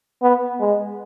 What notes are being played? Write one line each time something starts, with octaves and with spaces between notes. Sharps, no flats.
B3
G#3